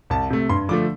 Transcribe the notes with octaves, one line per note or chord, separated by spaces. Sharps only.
C2 A5
C3 A3
G2 C6
D3 F3 A3 D6